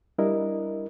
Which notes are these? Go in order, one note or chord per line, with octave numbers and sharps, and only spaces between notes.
G3 D4 E4 A#4 D#5